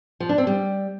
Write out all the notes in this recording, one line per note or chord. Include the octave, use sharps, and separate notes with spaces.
F3
D4
C4
G3